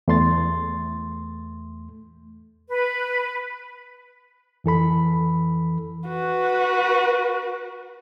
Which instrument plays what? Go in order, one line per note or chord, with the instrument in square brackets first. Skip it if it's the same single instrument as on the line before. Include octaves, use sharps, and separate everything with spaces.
[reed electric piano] E2 A3 C6 A6
[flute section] B4
[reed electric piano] F2 E3 A4 B5
[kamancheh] F#4 B4